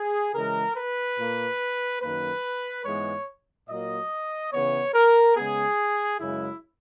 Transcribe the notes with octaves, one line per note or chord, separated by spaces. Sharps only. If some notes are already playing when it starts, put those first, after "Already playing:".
Already playing: G#4
C#3 E3 G#3 A#4
B4
A#2 A#3
F#2 D#3 A#3 B4
G#2 E3 G#3 B3 C#5
A#2 F#3 A#3 D#5
C#3 E3 B3 C#5
A#4
C#3 G#3 B3 G#4
F#2 C#3 G#3 E4